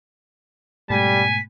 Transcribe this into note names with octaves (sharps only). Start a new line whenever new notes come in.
G#2 B2 G3 A3 G#5 B6